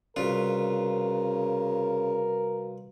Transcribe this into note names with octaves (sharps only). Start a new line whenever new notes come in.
C2 C#3 F4 F#4 A#4 B4 F5